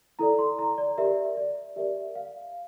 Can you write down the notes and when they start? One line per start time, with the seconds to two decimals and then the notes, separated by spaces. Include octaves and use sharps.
0.19 E4 A4 D5 A#5
0.39 C6
0.59 A#5
0.78 D5
0.98 G4 A#4 D5 E5
1.37 D5
1.76 G4 A#4 D5 E5
2.16 F5